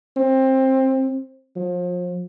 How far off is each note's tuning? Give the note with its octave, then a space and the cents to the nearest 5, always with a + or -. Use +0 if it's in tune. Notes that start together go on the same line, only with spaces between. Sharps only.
C4 +20
F3 +35